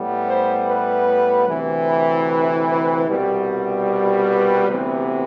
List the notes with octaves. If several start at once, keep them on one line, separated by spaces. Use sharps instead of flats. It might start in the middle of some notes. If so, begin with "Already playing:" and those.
Already playing: A2 G3 B3
C5
B4
D2 C3 E3
B4
B4
B4
C2 B2 G3
B4
D2 C3 E3 B3